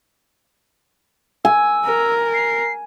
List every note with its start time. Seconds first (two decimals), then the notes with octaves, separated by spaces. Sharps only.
1.45 G#5 E6
1.85 A#4
2.34 C7